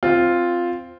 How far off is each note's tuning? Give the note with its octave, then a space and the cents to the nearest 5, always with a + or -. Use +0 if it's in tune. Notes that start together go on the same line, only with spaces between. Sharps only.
C4 +0 F4 +0